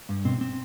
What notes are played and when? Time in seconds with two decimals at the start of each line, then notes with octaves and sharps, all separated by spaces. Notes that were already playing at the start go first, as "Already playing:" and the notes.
0.09 G2
0.25 B2 C4
0.41 C4